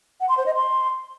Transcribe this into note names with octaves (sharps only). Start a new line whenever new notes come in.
F#5
C6
C5
D#5
C6